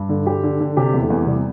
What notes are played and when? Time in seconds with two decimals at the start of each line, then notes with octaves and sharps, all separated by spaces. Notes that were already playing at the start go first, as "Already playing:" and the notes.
Already playing: G2
0.09 D3
0.26 D3 G4
0.43 D3
0.60 D3
0.77 C3 G4
0.93 E2
1.02 A3
1.10 E2
1.26 C3 G3